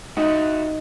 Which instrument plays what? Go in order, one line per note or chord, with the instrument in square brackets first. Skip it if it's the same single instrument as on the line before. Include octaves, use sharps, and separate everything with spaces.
[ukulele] D#4 [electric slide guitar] F#4 E5 F#5